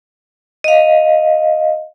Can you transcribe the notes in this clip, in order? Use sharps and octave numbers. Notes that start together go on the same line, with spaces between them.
D#5 F5